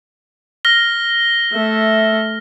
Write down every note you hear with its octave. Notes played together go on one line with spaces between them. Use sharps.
F6 A#6 G7
A3 E5